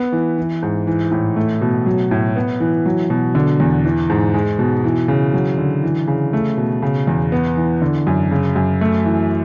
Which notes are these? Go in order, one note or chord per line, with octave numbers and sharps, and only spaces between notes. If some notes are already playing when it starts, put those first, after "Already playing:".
Already playing: B3
E3
E3
G#2
E3
A2
A3
B2
F#3
A2
B3
E3
F#3
B2
D3
E2
E3
G#2
G#3
B2
E3
C#3
F#3
D3
E3
C#3
A3
B2
C#3
E2
B3
E3
D3
F#2
C#3
F#2
A3
E3